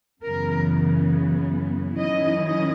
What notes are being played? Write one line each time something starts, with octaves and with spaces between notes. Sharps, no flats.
F#2 C#3 E3 B3 A#4
D#3 F#3 C#4 E4 D#5
D#5